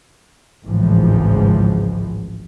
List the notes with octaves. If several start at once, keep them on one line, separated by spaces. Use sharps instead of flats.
G#1 C#2 A2 E3 F3